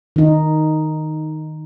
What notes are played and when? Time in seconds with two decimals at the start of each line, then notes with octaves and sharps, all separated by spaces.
0.16 D#3 D#4